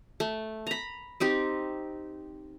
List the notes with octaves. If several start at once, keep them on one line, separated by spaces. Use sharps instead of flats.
A3
A#5 B5
C4 D#4 G4